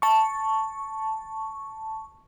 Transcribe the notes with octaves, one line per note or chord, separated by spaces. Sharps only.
A5 C#6